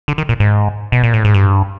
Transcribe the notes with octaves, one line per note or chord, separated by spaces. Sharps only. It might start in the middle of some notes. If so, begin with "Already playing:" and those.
D3
D#3
A#2
G#2
B2
A#2
A2
G#2
G2